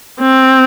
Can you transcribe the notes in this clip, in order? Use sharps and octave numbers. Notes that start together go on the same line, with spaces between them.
C4